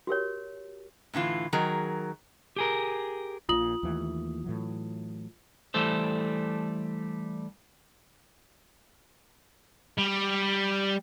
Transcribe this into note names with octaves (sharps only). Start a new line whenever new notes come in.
F#4 G4 A#4 C#5
A2 D3 E3 F4
D#3 F#3 G#4 A#4
G4 G#4 A#4
A#1 A#2 F4 D#6 F#7
D#2 E3 A3
A2 E3 F#3
E3 G3 A3 A4 C5
G3